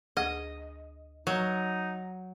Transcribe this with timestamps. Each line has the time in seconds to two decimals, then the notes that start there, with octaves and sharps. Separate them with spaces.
0.17 D2 G#4 D#5
1.27 F#3 D#4